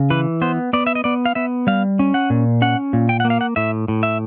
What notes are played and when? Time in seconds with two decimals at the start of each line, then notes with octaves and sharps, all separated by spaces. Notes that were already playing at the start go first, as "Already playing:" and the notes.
Already playing: C#3
0.10 E3 B4
0.41 B3 C5
0.73 B3 D5
0.87 E5
0.95 D#5
1.04 B3 D5
1.25 F5
1.35 B3 E5
1.67 G3 F5
1.99 C#4
2.14 F#5
2.30 A#2
2.62 C#4 F#5
2.93 A#2
3.09 G5
3.20 A#3 F#5
3.30 F5
3.41 F#5
3.56 A2 E5
3.88 A2
4.03 E5